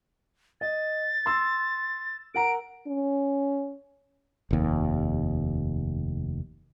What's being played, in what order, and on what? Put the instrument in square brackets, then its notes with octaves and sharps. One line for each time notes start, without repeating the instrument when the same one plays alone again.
[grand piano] D#5 [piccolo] A6
[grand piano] C6 E6
[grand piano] A#4 F#5 A#5 [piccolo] D7
[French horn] C#4
[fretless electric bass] F1 D#2